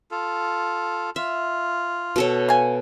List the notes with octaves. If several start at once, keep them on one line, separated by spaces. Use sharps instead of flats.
F4 A4
F4 E5
B2 A4 C#5
F5 G#5